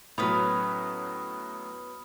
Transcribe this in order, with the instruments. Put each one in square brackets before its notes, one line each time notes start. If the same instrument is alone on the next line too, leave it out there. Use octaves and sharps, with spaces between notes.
[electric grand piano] A2 F#3 [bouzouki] B3 C#4 B4 [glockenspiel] B5 D#6 F6